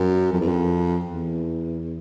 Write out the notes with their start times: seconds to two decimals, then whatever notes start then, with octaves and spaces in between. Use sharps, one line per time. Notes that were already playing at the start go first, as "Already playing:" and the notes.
Already playing: F#2
0.32 F2
0.40 E2
0.48 F2
1.05 E2